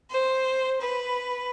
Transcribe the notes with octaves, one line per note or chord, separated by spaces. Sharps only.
C5
B4